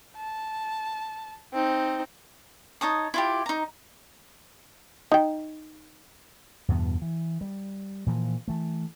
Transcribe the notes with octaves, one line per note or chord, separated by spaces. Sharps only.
A5
C4 D#4
D#4 C#5 A5 D#6
E4 F4 G4
D#4 A#5
D#4 G5
E2 G2 B2 B3
E3
G3
A#2 E3 F3
E3 A3